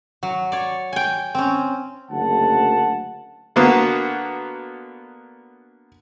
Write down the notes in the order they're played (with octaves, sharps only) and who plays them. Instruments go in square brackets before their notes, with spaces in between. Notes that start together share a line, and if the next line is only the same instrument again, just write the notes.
[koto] F#3
C#5 D5
G5 G#5
C4 C#4
[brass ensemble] F#1 D2 F#5 A5
[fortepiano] D3 A#3 B3 F#4